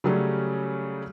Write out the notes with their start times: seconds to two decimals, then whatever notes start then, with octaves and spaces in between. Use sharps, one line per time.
0.04 C#3 F#3 G3 A3 C#4